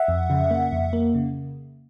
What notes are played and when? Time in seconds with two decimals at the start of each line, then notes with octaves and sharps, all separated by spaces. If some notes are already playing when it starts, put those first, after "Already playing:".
Already playing: E5 F#5
0.08 F2
0.30 C#3
0.51 A#3
0.72 F2
0.93 A#3
1.14 C#3